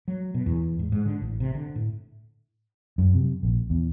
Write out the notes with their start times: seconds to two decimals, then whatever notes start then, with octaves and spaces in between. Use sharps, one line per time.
0.08 F#3
0.34 B2
0.46 E2
0.79 G#2
0.92 G#2
1.06 D3
1.22 A1
1.40 C3
1.55 D3
1.75 A2
2.98 F#2
3.14 C3
3.43 A#1
3.70 E2